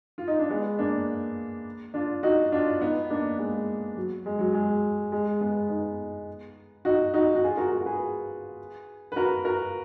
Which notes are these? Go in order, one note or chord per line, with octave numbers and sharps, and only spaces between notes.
F4
D#4
D4
G#3 B3
A#3 D4
D4 F4
D#4 F#4
D4 F4
B3 D#4
A#3 D4
G#3 B3
F#3
G#3
F#3
G#3
G#3
G#3 B3
B3 D#4
D#4 F#4
D#4 F#4
F#4
F4 G#4
F#4 A#4
F#4 A#4
G#4 B4
B4
F#4 A#4
F#4 A#4